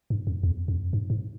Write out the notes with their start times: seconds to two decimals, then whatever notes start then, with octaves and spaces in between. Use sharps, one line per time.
0.10 G2
0.27 F2
0.43 E2
0.68 F2
0.93 G2
1.10 G#2